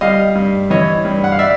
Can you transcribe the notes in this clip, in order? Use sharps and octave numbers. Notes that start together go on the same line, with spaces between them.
G3 D#5 F5
G2
E3 C#5 D#5
G2
F#5
F5
D5 E5